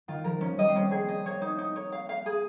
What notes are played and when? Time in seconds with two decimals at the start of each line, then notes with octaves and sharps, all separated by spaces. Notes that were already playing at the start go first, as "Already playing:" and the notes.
0.08 D#3 F4
0.24 F3 A#4
0.41 F3 C#4
0.58 G3 D#5
0.68 C4
0.75 A#3 C#4
0.91 C4 G#4
1.09 D#5
1.25 A#3 C#5
1.42 D#4
1.58 D#4
1.76 C#5
1.92 F5
2.09 F5
2.26 G#4